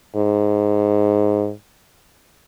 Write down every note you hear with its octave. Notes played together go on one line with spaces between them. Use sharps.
G#2